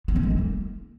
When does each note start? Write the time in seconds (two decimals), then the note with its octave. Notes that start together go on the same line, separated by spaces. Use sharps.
0.08 B3
0.16 C#4
0.23 G#3
0.31 E4
0.38 A#3